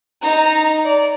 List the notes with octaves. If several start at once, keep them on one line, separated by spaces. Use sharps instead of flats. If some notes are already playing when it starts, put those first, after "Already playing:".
D#4 A#5
D5